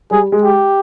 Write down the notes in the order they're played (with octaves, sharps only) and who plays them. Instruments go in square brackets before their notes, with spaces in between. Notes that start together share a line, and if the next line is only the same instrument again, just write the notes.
[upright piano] G3 [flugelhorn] G#4
[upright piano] G#3
[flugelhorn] G4